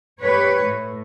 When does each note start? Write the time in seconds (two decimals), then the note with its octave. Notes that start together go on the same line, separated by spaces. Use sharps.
0.20 G4 B4 C#5
0.62 A2